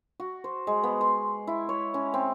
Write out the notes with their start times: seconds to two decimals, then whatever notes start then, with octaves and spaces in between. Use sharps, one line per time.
0.20 F#4
0.44 C5
0.67 G#3
0.84 B3
1.01 C6
1.47 E4
1.69 C#5
1.94 C#4
2.14 C4